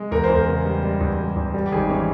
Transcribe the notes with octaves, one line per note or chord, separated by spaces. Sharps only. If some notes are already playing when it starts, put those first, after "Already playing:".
Already playing: G#3
E2 A#4
C5
E2
A#4
C#3
G3
G3
E2
G3
E2
G3
G4
G#1 G#4
E3 C#4